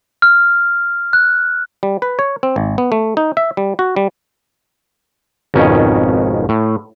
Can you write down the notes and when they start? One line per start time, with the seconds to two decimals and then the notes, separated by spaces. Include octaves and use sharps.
0.22 F6
1.13 F#6
1.83 G3
2.02 B4
2.19 C#5
2.43 C4
2.56 G#1
2.78 B3
2.92 A3
3.17 D#4
3.37 E5
3.57 G3
3.79 F#4
3.96 G3
5.54 G#1 F2 B2 D#3 C#4
6.49 A2